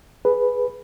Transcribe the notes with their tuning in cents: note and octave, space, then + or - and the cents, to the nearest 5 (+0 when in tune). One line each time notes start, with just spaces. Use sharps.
G#4 +0 B4 +0